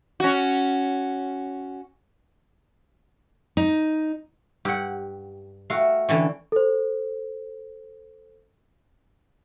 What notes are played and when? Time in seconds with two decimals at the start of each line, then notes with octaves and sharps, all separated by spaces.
0.20 C#4 F#4
3.57 D#4
4.65 G2 G4 F#5
5.70 A3 F#4 F5 G5
6.09 D3 E3 C#4 G5
6.52 A4 C5